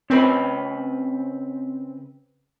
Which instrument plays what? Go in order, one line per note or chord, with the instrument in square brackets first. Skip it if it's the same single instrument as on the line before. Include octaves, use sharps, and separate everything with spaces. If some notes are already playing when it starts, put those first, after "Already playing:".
[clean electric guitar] C#3 B4 B5 [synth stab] C4